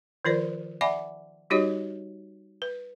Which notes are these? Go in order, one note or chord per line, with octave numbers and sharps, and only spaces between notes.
D#3 F3 F4 A#4 C5 D5
D5 E5 F#5 G#5 B5 D6
G3 D#4 F#4 G4 C#5 D#5
B4